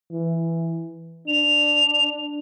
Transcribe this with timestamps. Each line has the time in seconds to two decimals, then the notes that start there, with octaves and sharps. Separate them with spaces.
0.12 E3
1.28 D4 F7